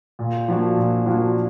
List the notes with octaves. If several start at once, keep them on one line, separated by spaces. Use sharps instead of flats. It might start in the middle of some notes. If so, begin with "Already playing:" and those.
A#2
F3 A#3 D4 F#4
A#2
F3 A#3 D4 F#4